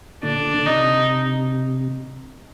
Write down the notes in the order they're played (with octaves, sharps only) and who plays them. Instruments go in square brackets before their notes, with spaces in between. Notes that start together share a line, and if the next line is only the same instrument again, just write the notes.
[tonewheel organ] A#2 D3 [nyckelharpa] D4
[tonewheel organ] D3
[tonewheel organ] C3 [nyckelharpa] D#4